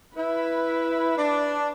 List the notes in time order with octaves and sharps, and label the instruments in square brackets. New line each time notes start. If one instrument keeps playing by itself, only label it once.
[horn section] E4 [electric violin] B4
[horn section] D4